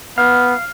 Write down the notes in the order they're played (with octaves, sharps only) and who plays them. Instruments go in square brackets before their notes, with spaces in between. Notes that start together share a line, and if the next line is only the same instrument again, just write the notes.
[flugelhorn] B3 [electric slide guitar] F5